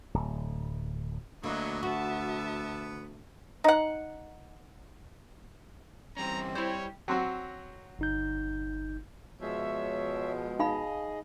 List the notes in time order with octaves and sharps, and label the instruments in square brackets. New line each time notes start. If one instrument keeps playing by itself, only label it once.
[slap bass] D1
[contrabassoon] D2 [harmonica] D3 F#3 B3 [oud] A#3 [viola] E4 D#5
[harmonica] B3 [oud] F#4 [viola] E5 A5
[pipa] D#4 F#5
[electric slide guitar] E3 G3 C#4 [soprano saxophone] C4 [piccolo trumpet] A#5
[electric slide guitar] G3 G4 [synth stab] E4 C5 [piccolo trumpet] C#5
[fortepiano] F#3 C4 F#4
[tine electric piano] G1 D#4 G6
[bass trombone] B2 [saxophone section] F3 G#3 [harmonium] C#5 E5
[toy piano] D#4 F5 B5 [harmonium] G#4 D#5